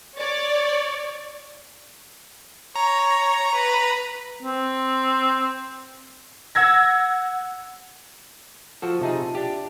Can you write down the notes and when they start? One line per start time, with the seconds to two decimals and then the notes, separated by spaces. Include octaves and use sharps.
0.17 C#5 D5
2.76 C#5 A#5
3.55 B4
4.43 C4
6.55 F#5 E6 G#6 A#6
8.82 F3 F4 F#4 A4
9.01 C3 D#4 F4 G#4 E5 A5
9.35 D4 G4